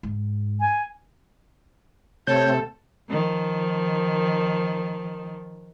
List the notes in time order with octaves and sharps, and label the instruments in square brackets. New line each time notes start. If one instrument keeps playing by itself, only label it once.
[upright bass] G#2
[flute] G#5
[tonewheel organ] C3 A3 C4 [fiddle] A4 [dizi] C#5 [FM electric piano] G6
[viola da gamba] D#3 F3